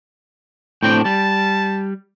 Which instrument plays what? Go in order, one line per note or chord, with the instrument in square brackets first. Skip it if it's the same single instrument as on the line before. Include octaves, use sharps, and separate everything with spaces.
[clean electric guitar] A2 C4 D4 [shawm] G5
[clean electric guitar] G3 [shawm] A5